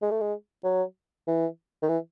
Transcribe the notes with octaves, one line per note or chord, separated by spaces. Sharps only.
G#3
A3
G#3
F#3
E3
D#3
E3